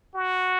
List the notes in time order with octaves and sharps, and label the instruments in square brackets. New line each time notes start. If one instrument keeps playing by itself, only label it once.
[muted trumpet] F#4